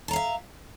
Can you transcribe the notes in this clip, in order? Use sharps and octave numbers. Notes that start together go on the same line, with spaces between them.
E5 F5 A5 A#5